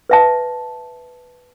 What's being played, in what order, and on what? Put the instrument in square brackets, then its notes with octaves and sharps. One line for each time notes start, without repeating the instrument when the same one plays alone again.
[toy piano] B4 E5 A5